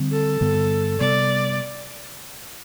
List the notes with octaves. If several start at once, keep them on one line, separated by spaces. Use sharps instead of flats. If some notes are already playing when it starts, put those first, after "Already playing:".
Already playing: D3 G3 C4
A4
G2 D3 G3 B3
C3 G3 B3 D5